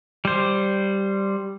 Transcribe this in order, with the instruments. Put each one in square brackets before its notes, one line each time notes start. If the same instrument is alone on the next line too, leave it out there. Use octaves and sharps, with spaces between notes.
[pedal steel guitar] G3 C5